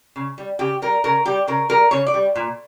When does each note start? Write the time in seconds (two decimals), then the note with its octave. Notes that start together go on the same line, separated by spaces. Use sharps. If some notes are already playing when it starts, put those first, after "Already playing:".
0.16 C#3
0.38 G3
0.59 C#3 G4
0.82 G3 A#4
1.04 C#3 A#4
1.25 G3 G4
1.47 C#3 A#4
1.69 G3 A#4
1.91 C#3 C#5
2.06 D5
2.14 G3
2.35 A#2